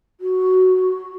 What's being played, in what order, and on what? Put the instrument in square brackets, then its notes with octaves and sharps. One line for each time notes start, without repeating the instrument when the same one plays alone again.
[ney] F#4